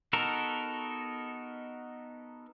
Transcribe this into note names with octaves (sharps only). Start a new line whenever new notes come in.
B3 D#4 F#4 A4 A#4